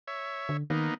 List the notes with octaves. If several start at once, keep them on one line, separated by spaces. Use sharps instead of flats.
C#5 E5
D3
D#3 A#3 B3 D#4